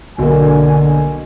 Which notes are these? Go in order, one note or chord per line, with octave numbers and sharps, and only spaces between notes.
B1 D3 A#3 G#5